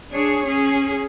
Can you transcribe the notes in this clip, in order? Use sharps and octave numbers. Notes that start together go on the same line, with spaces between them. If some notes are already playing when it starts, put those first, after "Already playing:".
D4 G#4 C#5
C#4 G#4